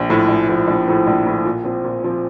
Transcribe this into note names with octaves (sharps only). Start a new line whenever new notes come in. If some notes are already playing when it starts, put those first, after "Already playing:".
Already playing: A#1
A2 F3
A#1
A2 F3
A#1
A2 F3
A#1
A2 F3
A#2
F3 C4
A#2
F3 C4